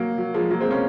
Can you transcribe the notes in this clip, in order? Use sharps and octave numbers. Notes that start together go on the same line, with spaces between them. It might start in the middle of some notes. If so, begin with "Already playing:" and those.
Already playing: F#3 A#3
F#3
F3 G#3
F#3 A#3
G#3 C4
A#3 C#4